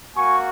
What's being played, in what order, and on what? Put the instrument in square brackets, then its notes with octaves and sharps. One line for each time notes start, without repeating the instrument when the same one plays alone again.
[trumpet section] A#3 F#4 G#5 C#6